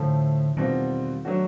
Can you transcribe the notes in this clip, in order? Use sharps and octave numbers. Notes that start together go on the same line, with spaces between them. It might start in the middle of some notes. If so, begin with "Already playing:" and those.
Already playing: A2 D3 F3 A3
E2 B2 D#3 G3 C4 F4
F#3 A3 D4 F#4